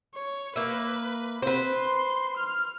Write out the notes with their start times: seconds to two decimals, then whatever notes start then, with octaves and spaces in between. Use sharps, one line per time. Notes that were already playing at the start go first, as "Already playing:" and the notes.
0.14 C#5
0.56 A#3 B4 E5
1.43 C4 B4 C5
1.75 C6
2.37 F6